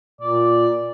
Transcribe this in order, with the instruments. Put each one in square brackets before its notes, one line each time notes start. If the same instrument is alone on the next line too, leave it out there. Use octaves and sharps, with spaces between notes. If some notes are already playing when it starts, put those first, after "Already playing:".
[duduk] A#2 [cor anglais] D5